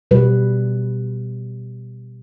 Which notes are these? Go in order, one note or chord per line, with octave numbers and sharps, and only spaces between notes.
B2 G3 B4